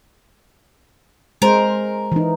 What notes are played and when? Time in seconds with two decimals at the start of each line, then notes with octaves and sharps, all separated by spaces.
1.42 G#3 A#4 C5
2.12 E3 D#4